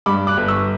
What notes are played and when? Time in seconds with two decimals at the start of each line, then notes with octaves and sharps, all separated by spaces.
0.06 G2 B5 D6
0.27 D6 F#6
0.37 G1
0.48 C#6 E6